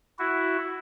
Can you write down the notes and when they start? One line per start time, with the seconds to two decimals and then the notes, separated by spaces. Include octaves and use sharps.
0.19 E4 F#4